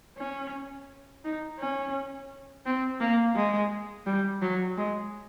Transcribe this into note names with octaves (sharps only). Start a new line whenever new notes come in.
C#4
D#4
C#4
C4
A#3
G#3
G3
F#3
G#3